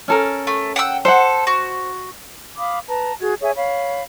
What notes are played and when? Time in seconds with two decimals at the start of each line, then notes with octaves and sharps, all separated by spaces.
0.08 C#4 A4 A#4
0.47 A3
0.76 F#5 G5 E6
1.05 A4 C5 F#5
1.47 F#4
2.57 F5 B5 D6 D#6
2.89 B4 A5 A#5
3.22 F#4 G#4 G#6
3.42 G#4 C#5 E5 G#5
3.56 C#5 F5 B5